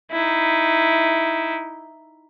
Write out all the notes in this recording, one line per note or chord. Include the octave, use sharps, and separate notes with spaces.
D#4 E4